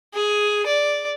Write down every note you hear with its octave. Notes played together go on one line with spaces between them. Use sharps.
G#4
D5